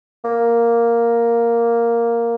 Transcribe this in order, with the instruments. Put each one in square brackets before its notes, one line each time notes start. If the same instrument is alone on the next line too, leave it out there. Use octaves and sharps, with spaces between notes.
[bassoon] A#3